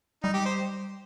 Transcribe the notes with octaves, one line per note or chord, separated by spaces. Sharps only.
G3 D#4
G4
C5